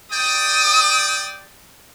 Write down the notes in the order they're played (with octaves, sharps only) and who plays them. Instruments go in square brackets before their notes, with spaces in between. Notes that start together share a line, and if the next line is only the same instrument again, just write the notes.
[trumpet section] D5 G5 [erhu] D#6